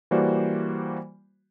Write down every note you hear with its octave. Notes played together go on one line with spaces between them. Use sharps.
E3 G3 A#3 F#4 C5 D5